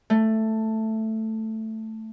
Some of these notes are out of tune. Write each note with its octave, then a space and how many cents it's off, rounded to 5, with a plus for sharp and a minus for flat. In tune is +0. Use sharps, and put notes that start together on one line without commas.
A3 +5